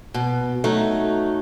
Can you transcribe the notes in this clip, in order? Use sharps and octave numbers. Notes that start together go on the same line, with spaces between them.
B2
F#3 A3 D#4